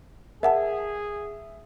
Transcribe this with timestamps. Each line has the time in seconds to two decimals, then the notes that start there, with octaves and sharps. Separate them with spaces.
0.43 G#4 A#4 E5 F#5 A5